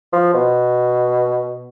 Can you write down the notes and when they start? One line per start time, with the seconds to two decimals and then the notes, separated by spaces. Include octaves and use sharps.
0.13 F3
0.34 B2